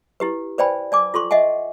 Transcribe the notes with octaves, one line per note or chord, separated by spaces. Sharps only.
E4 G4 B4
B4 C5 D5 G5 G#5 B5
D5 G#5 D6
F4 A4 C6 C#6
D#5 E5 F#5 G#5